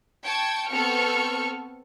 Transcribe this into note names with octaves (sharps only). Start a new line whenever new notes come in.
G5 A5 C#6 G#6
B3 C4 A4 C#6 F6